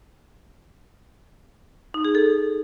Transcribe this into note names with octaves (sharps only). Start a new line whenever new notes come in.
D#4
G#4
A4